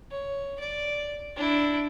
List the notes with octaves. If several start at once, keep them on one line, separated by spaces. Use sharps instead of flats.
C#5
D5
D4 E4